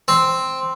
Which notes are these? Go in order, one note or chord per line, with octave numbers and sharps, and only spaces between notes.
C4